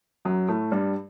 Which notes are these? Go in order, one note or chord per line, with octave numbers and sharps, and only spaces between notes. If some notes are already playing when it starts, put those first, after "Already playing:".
F#2 F#3
A2 A3
G2 G3